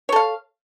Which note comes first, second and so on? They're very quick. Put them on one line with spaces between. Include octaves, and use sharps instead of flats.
C#5 A4 F5